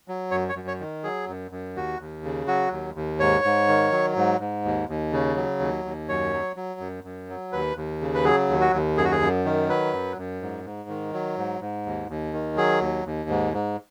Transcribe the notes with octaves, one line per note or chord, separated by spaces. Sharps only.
F#3
F#2 C#5
C#5
F#2
C#5
D#3
F#3 G#4
F#2
F#2
D#2 F#4
D#2
C#3
F#3 F#4
D#2
D#2
G#2 C#5
G#2
D#3
F#3
G#2
G#2
D#2
D#2
C#3
F#3
D#2
D#2
F#2 C#5
F#3
F#3
F#2
F#2
F#3
D#2 B4
D#2
C#3
B4
F#3 G#4
D#2
F#4
D#2
F#2 G#4
F#4
G#4
F#2
D#3
F#3 B4
F#2
F#2
G#2
G#2
D#3
F#3
G#2
G#2
D#2
D#2
D#3
F#3 G#4
D#2
D#2
G#2
G#2